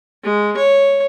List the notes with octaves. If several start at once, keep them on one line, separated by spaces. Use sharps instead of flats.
G#3
C#5